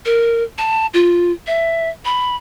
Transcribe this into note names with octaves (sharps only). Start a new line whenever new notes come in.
A#4
A5
F4
E5
B5